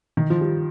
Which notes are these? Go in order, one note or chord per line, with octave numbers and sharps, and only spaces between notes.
D#3
F3
G3